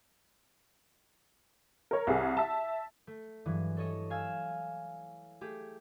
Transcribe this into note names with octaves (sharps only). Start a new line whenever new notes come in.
A#4 C#5
C2 G#4
E5 A5
A3
G2 E3 F#3 G#3
A4 C#5 D#5
F5 G#5 E6
A3 G4 G#4